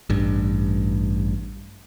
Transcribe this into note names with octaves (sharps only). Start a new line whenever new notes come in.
A1 G2